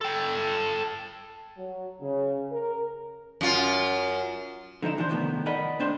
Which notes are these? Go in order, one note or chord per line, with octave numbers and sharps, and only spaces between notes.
A4 G5
F#3
C#3
A#4
F#2 F4
D3 F3 D#4 E4
E3 F3 D4 G4 C5
C2 A2 D#3 F3 B3
A#4 D5 D#5 F#5 B5
A2 C4 D4 C5 C6